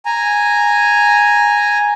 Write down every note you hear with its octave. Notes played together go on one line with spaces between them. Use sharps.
G#5 A#5